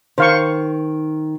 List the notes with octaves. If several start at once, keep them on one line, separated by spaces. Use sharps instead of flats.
D#3 C5 F5 C#6